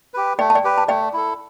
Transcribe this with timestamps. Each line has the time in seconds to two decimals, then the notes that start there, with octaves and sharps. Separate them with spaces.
0.14 G4 B4
0.39 A3 D5 G5
0.50 A5
0.55 D5 G5
0.64 G4 B4
0.78 A5
0.89 A3 D5 G5
1.13 E4 A4